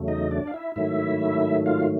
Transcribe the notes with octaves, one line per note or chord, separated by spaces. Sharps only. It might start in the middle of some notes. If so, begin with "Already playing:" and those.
Already playing: E2 C#3 F#3 A3
D#4 D#5
D4 D5
F5
E4 E5
G#2 D#3 F#3 A3 E4 E5
F4 F5